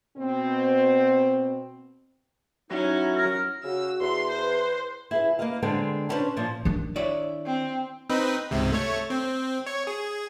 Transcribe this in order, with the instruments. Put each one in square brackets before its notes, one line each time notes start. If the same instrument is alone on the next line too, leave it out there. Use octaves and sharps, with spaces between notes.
[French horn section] B2 C4
[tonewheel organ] F#3 E4 F#4 [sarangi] C#4 [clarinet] D#4
[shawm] A#4
[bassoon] C#3 [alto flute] F#4 [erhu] E6
[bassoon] E2 [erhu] C6
[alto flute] B4 [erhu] C5
[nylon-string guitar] E4 G#4 B4
A#3 A#4 B4 D#5 F5
D3 G#3 B3 C4 D4
B3 C#4 D4 E4 B4 C5
A#2 F3
[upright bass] D#3 D4
[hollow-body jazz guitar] E4 C#5 D5
[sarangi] C4
[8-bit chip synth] C4 D#4 B4
C#2 G#2 C3
A3 C#5
C4
C#5
G#4